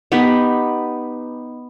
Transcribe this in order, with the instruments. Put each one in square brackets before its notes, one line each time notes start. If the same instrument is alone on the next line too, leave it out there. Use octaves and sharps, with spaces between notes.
[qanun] B3 D#4 G4 B4